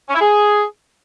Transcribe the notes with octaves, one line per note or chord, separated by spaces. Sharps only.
C#4
E4
G#4